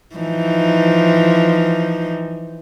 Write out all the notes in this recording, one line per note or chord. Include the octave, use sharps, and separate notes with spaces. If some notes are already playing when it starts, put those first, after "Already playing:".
E3 F3 D#4